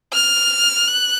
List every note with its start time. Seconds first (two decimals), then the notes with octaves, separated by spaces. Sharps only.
0.13 F6
0.88 F#6